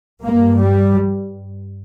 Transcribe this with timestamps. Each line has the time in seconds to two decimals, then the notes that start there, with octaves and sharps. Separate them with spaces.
0.22 G2 A#3
0.58 G3